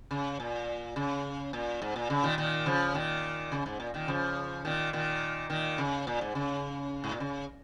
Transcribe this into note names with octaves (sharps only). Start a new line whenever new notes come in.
C#3
A#2
C#3
A#2
G#2
A#2
C#3
A#2 D#3
A#2 D#3
C#3 F3
A#2 D#3
C#3
G#2
A#2
A#2 D#3
C#3 F3
A#2 D#3
A#2 D#3
A#2 D#3
C#3
A#2
G#2
C#3
G#2
A#2
C#3